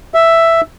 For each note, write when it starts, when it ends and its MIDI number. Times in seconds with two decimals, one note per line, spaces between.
0.14 0.61 76